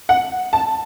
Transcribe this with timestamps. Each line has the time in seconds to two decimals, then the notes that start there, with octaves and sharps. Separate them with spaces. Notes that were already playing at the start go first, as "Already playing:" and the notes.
0.09 F#5
0.53 A5